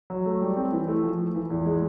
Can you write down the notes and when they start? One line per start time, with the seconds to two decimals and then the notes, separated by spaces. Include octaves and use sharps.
0.10 F#3
0.26 A3
0.42 G3
0.57 C4
0.72 E3
0.88 A3
1.04 F3
1.19 A3
1.35 E3
1.50 E2
1.66 G#3